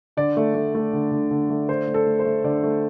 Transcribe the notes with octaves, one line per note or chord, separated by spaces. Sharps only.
D3 D5
A3
A3
A3
D3
D3
D3
A3
D3 C5
A3
A4
A3
C5
A3
D3 D5
A3